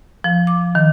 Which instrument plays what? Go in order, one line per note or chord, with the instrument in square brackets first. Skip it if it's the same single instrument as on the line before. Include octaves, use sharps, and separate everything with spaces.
[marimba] F3
D6
D#3